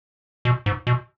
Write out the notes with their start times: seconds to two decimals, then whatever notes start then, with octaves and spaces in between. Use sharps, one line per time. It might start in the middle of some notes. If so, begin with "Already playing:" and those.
0.45 B2
0.66 G#2
0.87 B2